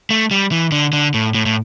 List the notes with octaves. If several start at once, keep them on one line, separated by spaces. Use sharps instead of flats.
A3
G3
E3
D3
D3
A2
A2
A2